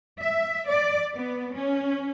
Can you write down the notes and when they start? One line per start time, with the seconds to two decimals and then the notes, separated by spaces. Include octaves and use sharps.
0.20 E5
0.67 D5
1.16 B3
1.54 C#4